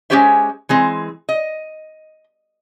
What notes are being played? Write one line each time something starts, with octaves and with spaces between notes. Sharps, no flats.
G#3 C4 C#4 G4 C5 E5
E3 G#3 C4
D#5